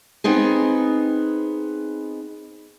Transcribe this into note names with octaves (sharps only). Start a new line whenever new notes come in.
B3 C4 D#4 G#4